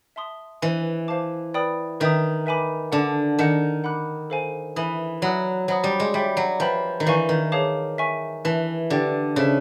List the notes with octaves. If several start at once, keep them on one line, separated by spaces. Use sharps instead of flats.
E5 A5 C6 D#6
E3 C5 D#5 G#5
C5 F5 A5 D6
B4 D5 G5 B5 D#6
D#3 B4 E5 G5 A#5 D#6
B4 E5 G#5 B5 D6
D3 F#5 A5 D6
D#3 D#5 F#5 A5
F#5 B5 D6 F#6
A4 C5 F5 G#5
E3 E5 G#5 B5 D#6
F#3 D5 F#5 B5 D#6 F#6
F#3 C5 D#5 F#5 B5 D#6
G3
G#3
G3 C#5 E5 G5 B5 D6
F#3
F3 B4 E5 G5 B5
D#3
E3 B4 D5 F5 G#5 C#6
D#3
G#4 C#5 F5 A5 D6
E5 G#5 C#6
E3 B4 E5 A5
D3 G4 B4 D5 G5
C#3 A4 C5 E5 A5